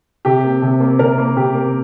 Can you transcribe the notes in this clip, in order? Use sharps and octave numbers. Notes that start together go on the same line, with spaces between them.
C3 G4
A#3
C3
A#3
C3 A#4
A#3
C3 G4
A#3